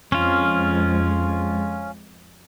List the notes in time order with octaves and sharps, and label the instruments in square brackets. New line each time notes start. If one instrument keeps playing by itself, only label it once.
[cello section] F2 G#3 [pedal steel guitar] C#4 F4